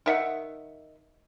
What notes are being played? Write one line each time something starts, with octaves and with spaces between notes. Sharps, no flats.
D#3 E5 F#5